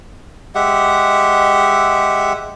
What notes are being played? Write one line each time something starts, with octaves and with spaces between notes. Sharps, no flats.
G#3 G4 E5 F#5